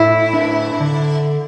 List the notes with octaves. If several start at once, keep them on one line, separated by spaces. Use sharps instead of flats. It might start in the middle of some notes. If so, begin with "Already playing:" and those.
Already playing: A2 E4
D4
D3